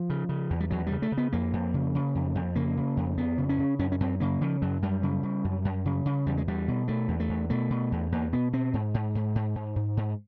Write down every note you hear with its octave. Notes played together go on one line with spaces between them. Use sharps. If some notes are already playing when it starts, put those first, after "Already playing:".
Already playing: F3
C#3
C#3
E2
G3
E2 F#3
G3
C#3
A3
C#3
B3
F2 A#3
F2
C#3
C#3
F2
F2
C#3 A#3
C#3
F2
F2 B3
C#3
C#4
C#3
F#2 C#4
C#4
F#2 C4
C#3 A#3
C#3 F3
F#2 F#3
F#2 G3
C#3
C#3
F#2
F#2
C#3
C#3
E2 G3
G#3
E2 G3
B2
B2 A3
E2
A3
E2
B2 A3
B2
E2
E2 A#3
B2 B3
B2 C4
G#2
G#2
G#2
G#2
G#2
G#2
G#2